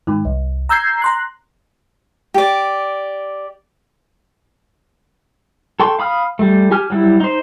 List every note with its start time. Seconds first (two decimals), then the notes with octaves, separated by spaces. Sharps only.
0.07 G#2 D#3
0.25 C2
0.69 A#5 E6 G6 G#6 C7
1.02 A#5 C6 F#6
2.34 G4 D5
5.80 A4 G5 C6 C#6
5.99 F5 B5 D#6 F6
6.39 G3 A3
6.71 G4 G#5 F6
6.90 F#3 G3 E4
7.20 D#4 C5